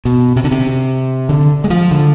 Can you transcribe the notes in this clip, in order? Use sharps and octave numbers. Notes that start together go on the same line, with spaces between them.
B2
C3
D3
C3
D3
G#3
F3
D3